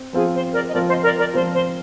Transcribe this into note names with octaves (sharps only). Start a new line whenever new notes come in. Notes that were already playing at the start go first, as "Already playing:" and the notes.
Already playing: C4
F3 C4 F4 G#4
C5
A#4 D5
D#5
F3 C4 F4 A#4 D5
C5 D#5
A#4 D5
A#4 D5
F3 C4 F4 C5
C5